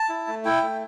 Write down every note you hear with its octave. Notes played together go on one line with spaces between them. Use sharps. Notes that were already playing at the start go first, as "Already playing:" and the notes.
Already playing: A5
E4
A3
E4 G5
A3